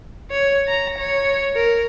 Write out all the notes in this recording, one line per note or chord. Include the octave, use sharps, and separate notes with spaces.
C#5
A#5
C#5
A#4